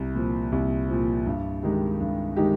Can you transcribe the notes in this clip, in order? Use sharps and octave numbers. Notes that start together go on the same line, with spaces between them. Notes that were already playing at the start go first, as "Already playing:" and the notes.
Already playing: C2
A#2 F3
C2
A#2 F3
G2
D#3 G#3 D#4 G4
G2
D#3 G#3 D#4 G4